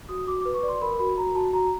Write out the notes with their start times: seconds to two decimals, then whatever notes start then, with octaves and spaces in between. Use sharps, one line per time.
0.09 F#4 D#6
0.27 F#4 D6
0.41 B4 D6
0.54 C#6
0.63 D5
0.68 C6
0.81 A#4 B5
0.99 F#4 B5
1.17 F#4 A#5
1.35 F#4 A5
1.53 F#4 A#5